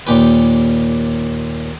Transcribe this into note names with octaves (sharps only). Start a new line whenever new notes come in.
D#2 A#2 G4 B4